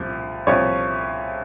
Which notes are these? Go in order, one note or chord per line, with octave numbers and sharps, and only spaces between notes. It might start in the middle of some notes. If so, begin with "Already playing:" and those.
Already playing: C2 A#2 F3
C2 A#2 F3 C#5